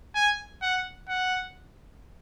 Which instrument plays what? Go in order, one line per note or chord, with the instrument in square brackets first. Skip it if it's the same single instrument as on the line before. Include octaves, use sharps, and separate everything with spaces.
[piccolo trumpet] G#5
F#5
F#5